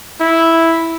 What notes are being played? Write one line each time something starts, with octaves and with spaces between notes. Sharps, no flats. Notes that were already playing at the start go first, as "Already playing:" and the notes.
E4